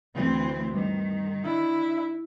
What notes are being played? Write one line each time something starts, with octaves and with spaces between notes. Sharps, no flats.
D2 E3 C4
G2 D#3
D4 E4